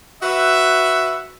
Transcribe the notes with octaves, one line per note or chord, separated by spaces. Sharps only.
F#4 B4 E5